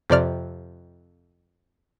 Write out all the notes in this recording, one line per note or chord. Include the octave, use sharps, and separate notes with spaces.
F2 C3 D5 F6